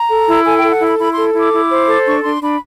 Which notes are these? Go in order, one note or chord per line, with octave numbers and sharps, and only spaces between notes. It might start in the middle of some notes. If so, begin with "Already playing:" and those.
Already playing: A#5
A4
E4
A4 G#5
A4 G5
F#5
E4
B5
E4 B5
A4 C6
E4 D6
E4
C5
A4
D4 C#6
D4 C6
D4 B5